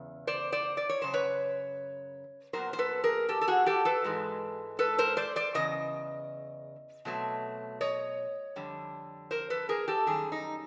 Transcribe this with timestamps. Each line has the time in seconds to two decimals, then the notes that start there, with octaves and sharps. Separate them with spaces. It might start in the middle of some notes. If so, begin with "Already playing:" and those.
Already playing: E2 C#3
0.27 C5 D5
0.52 C5 D5
0.77 D5
0.89 C#5
1.02 F#2 C#3 C5
1.13 B4 C#5
2.53 A#2 F#3 B3 A#4 C5
2.73 C5
2.78 A4 B4
3.04 G#4 A#4
3.29 G4 A4
3.41 A4
3.47 F#4 G#4
3.66 G4 A4
3.85 A4 B4
4.04 G#2 E3 G#3
4.79 A4 B4
4.98 A#4 C5
5.17 C5 D5
5.36 C5 D5
5.54 E2 C#3 D#5
7.05 B2 F#3 A3 C4
7.81 C#5 D#5
8.56 F2 D3 G3
9.31 A#4 C5
9.50 A4 B4
9.69 G#4 A#4
9.88 G4 A4
10.07 F#2 D#3 G3 G#4
10.32 D#4